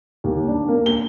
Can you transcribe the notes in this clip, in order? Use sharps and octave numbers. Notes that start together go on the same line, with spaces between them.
D#2
D4
A#3
G7